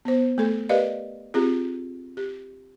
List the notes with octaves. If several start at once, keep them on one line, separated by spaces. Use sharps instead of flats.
B3 C5
A3 A4
G4 A#4 B4 D5 D#5 F5
C4 F4 G4 G#4
G4